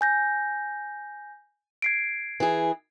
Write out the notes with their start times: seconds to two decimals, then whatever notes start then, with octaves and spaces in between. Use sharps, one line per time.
0.01 G#5 G6 A#6
1.82 G#6 C7 D7
2.40 E3 G#4